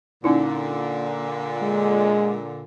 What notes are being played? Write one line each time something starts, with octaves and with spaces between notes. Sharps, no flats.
A#2 D3 C#4 D#4 E4
G#3